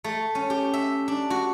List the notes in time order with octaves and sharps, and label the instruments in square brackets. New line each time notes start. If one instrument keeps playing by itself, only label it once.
[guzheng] A3
C#4
G4
E5
D4
F#4